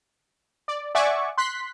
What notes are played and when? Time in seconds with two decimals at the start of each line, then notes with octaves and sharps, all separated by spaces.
0.68 D5
0.95 D5 E5 F#5 G#5 C#6 D6
1.38 C6 F#6 B6